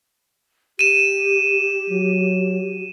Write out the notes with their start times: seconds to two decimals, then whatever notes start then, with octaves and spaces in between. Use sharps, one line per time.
0.79 G4 D#7 E7
1.90 F#3